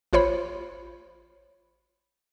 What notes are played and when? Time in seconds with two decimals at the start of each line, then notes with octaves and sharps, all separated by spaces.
0.13 A1 F4 C5 C#5 B5